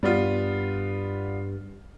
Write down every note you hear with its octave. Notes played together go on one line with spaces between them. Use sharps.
G2 G3 B3 F4